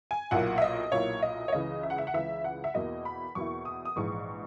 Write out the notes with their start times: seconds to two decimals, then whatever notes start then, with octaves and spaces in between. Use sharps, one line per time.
0.11 G#5
0.31 B1 A#2 A#3 E4 F#5
0.58 E5
0.62 D#5
0.92 B1 A#2 A#3 E4 C#5
1.22 D#5
1.48 C#5
1.52 C#2 C#3 E3 D#5
1.83 E5
1.90 F#5
1.98 E5
2.07 F#5
2.14 C#2 C#3 E3 E5
2.44 F#5
2.64 E5
2.74 E2 B2 A#3 E4 D#5
3.05 B5
3.35 E2 B2 A#3 E4 C#6
3.65 D#6
3.85 D#6
3.96 A#1 G#2 E3 G#3 C#6